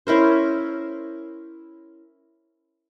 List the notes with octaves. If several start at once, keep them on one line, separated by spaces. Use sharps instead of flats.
C#4 E4 A#4 C5